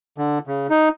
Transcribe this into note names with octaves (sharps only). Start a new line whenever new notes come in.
D3
C#3
D#4